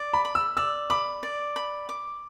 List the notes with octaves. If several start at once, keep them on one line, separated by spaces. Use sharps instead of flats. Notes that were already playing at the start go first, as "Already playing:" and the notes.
Already playing: D5
B5
B5
E6
D5 E6
B5 D6
D5
B5
D6